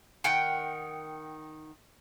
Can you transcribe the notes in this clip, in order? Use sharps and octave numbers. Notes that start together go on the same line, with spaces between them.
D#3 F#5 G5